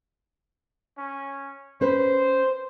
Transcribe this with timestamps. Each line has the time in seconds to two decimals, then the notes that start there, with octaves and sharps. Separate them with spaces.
0.98 C#4
1.81 C#4 B4 C5